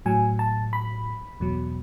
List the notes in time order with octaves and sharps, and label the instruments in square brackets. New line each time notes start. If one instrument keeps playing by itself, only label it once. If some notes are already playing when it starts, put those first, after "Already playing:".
[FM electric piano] A2 F#3 G#5
A5
B5
E2 B2 F#3